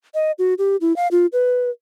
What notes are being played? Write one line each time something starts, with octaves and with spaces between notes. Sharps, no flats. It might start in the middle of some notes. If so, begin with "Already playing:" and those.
D#5
F#4
G4
E4
F5
F4
B4